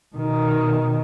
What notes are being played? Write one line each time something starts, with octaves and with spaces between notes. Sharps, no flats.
B2 D#3